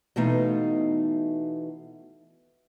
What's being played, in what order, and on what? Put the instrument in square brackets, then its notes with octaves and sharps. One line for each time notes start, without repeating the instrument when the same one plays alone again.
[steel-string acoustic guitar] B2 E3 A3 D#4 F5